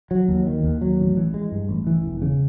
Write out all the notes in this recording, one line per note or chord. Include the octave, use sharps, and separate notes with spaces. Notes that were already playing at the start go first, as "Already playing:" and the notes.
F#3
D#2
D#3
D#2
F#3
A1
E3
G#3
G2
A1
E3
E1
C#3